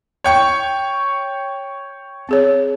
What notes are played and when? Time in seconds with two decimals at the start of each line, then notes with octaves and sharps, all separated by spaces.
0.24 C#5 G5 C#6
2.29 C4 G#4 C#5